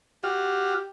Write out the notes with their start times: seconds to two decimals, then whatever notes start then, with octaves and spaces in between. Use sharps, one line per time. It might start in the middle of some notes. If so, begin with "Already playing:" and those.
0.24 F#4 G4 F6